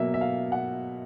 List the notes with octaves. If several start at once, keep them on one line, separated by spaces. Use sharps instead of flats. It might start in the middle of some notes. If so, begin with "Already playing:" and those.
Already playing: B2 F#3 A#3 E5
E5
F5
F#5